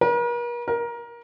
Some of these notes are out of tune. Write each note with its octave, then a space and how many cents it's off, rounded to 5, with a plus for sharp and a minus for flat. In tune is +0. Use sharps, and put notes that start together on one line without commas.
A#4 +45
A#4 +20